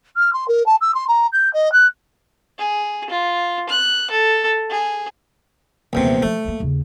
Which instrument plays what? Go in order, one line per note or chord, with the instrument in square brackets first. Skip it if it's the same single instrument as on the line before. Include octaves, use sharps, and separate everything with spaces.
[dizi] F6
C6
A#4
A5
E6
C6
A#5
G6
D#5
F#6
[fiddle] G#4
F4
F#6
A4
G#4
[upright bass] D#1 B3 [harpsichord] A#1 E2 C3
[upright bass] F3 G#3 [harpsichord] A3
[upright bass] G#3 A#3
D#2 C#3